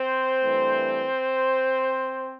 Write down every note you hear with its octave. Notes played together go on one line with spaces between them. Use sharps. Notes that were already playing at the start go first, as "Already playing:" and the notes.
Already playing: C4 C5
G2 E3 A3